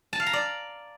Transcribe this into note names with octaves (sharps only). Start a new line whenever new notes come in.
A5
F5
A#5
D5